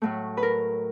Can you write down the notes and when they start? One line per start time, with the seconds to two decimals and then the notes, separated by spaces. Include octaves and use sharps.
0.02 A2 F#3 A3
0.37 B4
0.43 A#4